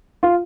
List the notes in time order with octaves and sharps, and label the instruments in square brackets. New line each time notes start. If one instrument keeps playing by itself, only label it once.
[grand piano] F4